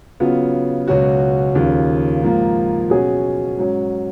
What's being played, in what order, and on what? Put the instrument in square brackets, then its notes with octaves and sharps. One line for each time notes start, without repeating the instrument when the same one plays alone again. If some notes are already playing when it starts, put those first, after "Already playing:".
[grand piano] C#3 F#3 B3 F4
C#2 B2 F#3 C#4 F#4
D#2 C#3 F3
G#2 F3 A#3
B2 F#3 C#4 G#4
G#2 F#3 C#4